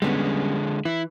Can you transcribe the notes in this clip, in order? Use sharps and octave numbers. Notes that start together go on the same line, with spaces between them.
D3 G3 G#3 B3 C#4
E3 E4